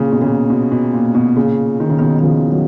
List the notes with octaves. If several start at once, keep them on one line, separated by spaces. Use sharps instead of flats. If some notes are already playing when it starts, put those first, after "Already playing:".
Already playing: A#2 C#3
B2
A#2 C#3
B2
B2
A#2
B2
A#2 C#3
D#3
C#3
B2 D#3
D#3
C#3 F3
D#3 F#3